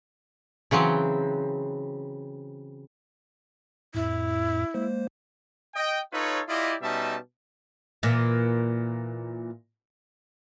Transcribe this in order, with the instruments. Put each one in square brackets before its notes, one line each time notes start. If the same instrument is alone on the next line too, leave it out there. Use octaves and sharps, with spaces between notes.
[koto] C#3 E3 F#3 C4
[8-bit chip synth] F2 A2 [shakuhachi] E4
[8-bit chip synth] G#3 A#3 C5
[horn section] D#5 G5
D#4 F4 A4 B4 C#5
E4 F4 G4 D5 D#5
B2 G3 C#4 D#4 E5 A5
[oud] A#2 E3